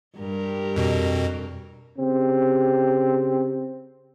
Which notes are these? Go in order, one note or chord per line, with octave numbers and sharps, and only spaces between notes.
G2 G4 A#4
F2 B2
C#3 C4 G4